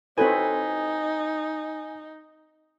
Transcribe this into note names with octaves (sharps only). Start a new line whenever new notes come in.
C4 D#4 E4 F#4 A4 B4 C#5 G#5